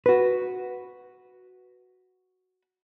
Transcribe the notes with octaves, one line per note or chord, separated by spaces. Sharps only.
F#4 B4